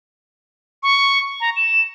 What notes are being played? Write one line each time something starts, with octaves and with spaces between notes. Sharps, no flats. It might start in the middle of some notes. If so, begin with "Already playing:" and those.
C#6
A#5
E7